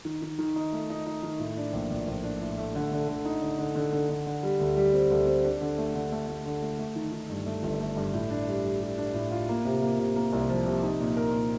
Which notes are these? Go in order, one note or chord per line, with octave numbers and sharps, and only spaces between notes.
D#3
D#3
D#3
D#4
A3
D#4
D#4
D#3
A2
D4
A#1
A#1
A#1
D4
A2
A3
D3
D3
D3
D#4
D3
D3
D3
D3
D3
D3
G3
D2
G3
C4
D2
C4
D4
D3
A3
D3
A3
A3
D3
A3
A3
D#3
D#3
G2
A3
G1
A3
G2
A2
D4
G3
G3
G3
D4
A2
F4
A#3
C3
A#3
C3
A#3
C2
F3
C3
D#4
A#2
A#4
A#2